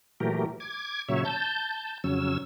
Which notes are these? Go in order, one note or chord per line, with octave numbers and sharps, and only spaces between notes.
A#2 E3 F#3 A3 G4 A#4
D6 G#6
A#2 C#3 F#3 C#5 E5
A5 G6
F2 C#3 F#3 C#4 E6